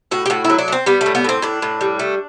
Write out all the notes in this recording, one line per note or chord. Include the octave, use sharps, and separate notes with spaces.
A2 F#4
G4
A2 F#4
E4
F#3
D4
A3
C4
G3 B3
A3
A2
B3
A2 C4
A2 D4
A2
G3
A3